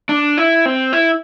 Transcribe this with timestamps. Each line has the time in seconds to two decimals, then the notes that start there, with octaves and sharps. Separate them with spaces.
0.09 D4
0.38 E4
0.66 C4
0.93 E4